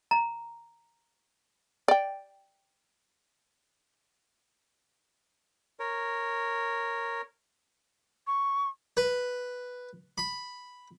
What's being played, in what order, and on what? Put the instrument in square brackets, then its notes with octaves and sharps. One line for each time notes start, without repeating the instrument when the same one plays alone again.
[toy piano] A#5
[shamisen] D5 G5
[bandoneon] A#4 C#5
[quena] C#6
[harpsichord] B4
B5